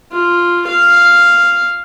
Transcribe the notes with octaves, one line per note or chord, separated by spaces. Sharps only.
F4
F5